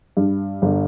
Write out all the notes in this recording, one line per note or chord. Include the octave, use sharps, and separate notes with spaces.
G2
G1